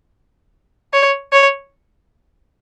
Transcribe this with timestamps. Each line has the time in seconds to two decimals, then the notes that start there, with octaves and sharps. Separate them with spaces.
0.93 C#5
1.33 C#5